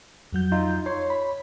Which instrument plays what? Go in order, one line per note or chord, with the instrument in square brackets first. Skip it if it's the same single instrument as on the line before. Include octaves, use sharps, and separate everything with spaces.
[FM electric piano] F2 F#3 G6
[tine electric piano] D#4 F4
[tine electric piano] C#5 [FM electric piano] C6
[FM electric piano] B5